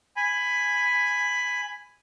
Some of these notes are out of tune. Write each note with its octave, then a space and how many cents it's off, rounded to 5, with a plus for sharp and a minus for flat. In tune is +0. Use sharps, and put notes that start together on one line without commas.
G#5 -5 B5 +10